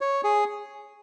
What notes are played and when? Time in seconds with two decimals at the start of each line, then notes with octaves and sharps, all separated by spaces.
0.01 C#5
0.24 G#4